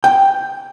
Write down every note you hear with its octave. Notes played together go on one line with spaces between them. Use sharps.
G5